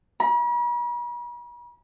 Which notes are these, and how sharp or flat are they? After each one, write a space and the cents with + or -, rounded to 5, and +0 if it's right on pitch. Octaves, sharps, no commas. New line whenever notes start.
B5 -45